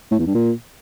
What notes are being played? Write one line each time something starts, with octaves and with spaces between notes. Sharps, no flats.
A2
E2
G2
A#2